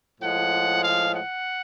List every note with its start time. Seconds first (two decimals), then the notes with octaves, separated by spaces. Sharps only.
0.20 A2 F3 G#3 F#5
0.81 F5
1.13 F#5